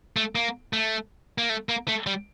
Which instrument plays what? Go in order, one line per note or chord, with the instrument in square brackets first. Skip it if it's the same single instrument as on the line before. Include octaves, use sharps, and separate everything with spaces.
[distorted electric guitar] A3
A#3
A3
A#3
A3
A#3
A3
G3